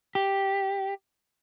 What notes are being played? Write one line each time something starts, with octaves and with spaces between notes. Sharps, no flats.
G4